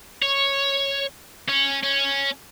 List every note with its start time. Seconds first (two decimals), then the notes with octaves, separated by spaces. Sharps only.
0.22 C#5
1.49 C#4
1.84 C#4